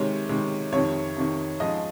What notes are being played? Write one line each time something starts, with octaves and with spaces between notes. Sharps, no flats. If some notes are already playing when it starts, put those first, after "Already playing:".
Already playing: C3 D#3 G#3 C#5
C3 D#3 G#3
F2 C3 D#3 C#5
F2 C3 D#3
G#2 F3 G#3 C#4 D#5